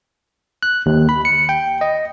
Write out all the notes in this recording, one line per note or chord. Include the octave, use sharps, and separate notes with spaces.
F#6
D#2
B5
C#7
G5
D#5